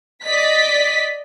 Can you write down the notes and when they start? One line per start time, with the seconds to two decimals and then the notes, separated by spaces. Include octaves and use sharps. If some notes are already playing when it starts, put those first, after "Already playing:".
0.23 D5 D#5 B6